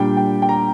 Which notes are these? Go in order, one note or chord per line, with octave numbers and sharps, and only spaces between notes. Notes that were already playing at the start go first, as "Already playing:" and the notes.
Already playing: A#2 G3 D4 G5
G5
G5
A#5